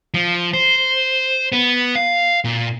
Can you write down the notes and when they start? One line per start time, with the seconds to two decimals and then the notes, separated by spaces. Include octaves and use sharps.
0.14 F3
0.53 C5
1.52 B3
1.95 F5
2.44 A#2